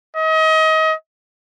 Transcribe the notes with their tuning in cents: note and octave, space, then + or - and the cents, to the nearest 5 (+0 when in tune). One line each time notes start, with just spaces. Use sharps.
D#5 +30